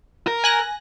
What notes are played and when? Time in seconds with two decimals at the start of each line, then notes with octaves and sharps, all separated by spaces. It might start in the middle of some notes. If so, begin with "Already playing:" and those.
0.27 A#4
0.44 G#5 F#6 A#6